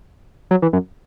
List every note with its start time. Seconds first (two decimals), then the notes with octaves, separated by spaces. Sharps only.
0.51 F#3
0.62 E3
0.73 F#2